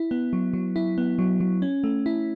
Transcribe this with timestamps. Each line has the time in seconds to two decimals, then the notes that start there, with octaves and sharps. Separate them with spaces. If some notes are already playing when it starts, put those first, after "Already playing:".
Already playing: E4
0.11 B3
0.33 F#3
0.53 F#3
0.76 E4
0.98 B3
1.19 F#3
1.40 F#3
1.62 C#4
1.84 A3
2.06 E4